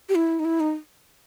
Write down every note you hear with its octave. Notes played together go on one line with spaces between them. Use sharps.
G4
E4
D#4
E4
D#4